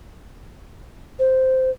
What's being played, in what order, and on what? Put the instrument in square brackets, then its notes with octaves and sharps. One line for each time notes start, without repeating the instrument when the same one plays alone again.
[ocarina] C5